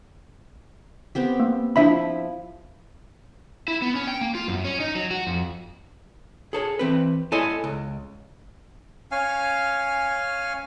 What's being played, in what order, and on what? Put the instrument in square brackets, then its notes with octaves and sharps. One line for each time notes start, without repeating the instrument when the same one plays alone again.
[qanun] B3 C4 G4
[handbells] A#3
[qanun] F3 E4 [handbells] D4 E5 B5
[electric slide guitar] E4
B3
C#4
G5
A#3
F4
F#2
C#4
D#4
F#3
F#4
F2
[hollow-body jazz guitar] G#4 A4 C#5
E3 C4 B4
E4 A4 C#5 D#5 G#5 C6
C#2
[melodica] C#4 F5 G#5